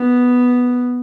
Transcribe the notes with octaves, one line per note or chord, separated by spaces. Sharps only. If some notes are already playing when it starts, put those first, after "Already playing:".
Already playing: B3